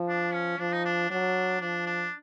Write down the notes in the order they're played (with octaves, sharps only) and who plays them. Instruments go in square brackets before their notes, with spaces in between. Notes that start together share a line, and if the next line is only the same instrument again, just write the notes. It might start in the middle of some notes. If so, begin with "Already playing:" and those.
Already playing: [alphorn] F3
[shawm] D4
C#4
[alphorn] F3 [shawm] D4
[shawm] D#4
D4
[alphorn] F#3 [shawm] D4
[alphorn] F3 [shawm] D4
[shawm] D4